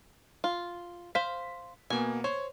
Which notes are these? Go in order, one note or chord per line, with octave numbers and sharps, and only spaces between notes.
F4
C5 F5 B6
B2 A#3 B3 G#5
C5 C#5